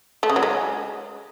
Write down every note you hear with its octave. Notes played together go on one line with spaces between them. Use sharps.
A3
C#3
F#3
G#3